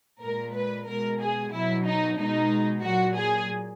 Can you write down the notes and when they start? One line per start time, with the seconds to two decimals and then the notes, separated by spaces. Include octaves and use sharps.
0.22 A#2 G#3 A#4
0.56 B4
0.88 B2 G#3 A#4
1.21 G#4
1.53 B2 F#3 E4
1.86 D#4
2.18 B2 G#3 D#4
2.84 A#2 F#3 F#4
3.17 G#4